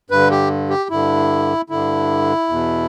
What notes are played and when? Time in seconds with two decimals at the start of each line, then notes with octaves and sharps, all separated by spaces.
0.10 G2 D3 B4
0.31 G4
0.70 G4
0.90 G2 D3 E4
1.70 G2 D3 E4
2.49 E2 B2